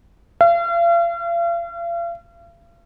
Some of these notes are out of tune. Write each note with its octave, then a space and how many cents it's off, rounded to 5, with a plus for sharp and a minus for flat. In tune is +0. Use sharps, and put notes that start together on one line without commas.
F5 -40